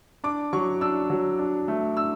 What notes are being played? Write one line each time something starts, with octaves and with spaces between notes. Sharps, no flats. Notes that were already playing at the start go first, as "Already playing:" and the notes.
D4 D6
F#3 C#6
D4 E6
F#3
D4
A3
D4 E6